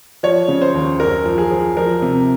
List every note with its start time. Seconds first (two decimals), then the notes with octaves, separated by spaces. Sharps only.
0.23 F3 C#5
0.48 C#3
0.62 C5
0.74 D#2
1.00 F#2 A#4
1.25 F3
1.38 G#4
1.51 F3
1.77 F3 A#4
2.02 C3